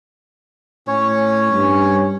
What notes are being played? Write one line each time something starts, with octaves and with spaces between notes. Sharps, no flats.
A2 C#4 C#5
G2